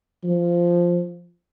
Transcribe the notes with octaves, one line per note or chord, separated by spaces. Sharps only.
F3